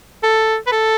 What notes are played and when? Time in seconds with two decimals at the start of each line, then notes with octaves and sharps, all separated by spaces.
0.23 A4
0.67 B4
0.72 A4